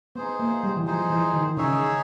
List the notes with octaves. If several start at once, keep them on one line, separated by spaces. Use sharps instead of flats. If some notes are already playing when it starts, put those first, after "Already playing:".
B3 D#4 G#4 C5
A#3
G3
E3
F3 D#4 G#4 C5
E3
D#3
C#3 D#4 G#4 C#5 E5